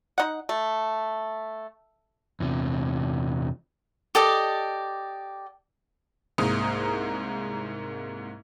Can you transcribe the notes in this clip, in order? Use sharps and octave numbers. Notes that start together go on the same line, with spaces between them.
D#4 F#5
A3
E2 C3
G4 A4 D5 D#5
C2 G#2 A#3 A#4 D#6